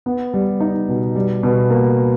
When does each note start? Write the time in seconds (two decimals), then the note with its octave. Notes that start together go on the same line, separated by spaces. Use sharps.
0.06 B3
0.34 G3
0.60 D#4
0.88 B2
1.16 G3
1.43 B2
1.70 A#3